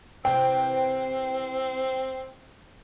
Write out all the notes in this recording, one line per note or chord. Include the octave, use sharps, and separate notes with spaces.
C3 E3 C4 G5